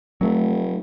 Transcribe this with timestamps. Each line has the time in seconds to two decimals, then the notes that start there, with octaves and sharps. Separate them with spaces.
0.21 F1 F#3 A3